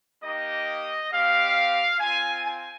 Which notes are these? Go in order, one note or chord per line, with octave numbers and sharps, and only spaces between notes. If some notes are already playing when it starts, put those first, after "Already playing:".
A#3 D#4 G4 D#5
C4 G4 F5
C4 F4 G#5
G#5